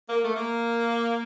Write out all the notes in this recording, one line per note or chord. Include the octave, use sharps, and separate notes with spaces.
A#3
A3
A#3